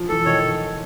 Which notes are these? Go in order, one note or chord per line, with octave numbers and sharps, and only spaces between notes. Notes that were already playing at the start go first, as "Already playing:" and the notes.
Already playing: F3
E3 A4
D#3 C#5